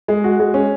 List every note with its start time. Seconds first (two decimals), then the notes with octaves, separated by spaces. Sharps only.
0.08 G#3
0.24 F#4
0.40 G#3
0.54 C#4